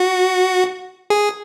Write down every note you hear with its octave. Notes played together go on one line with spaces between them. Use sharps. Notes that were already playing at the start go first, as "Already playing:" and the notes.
Already playing: F#4
G#4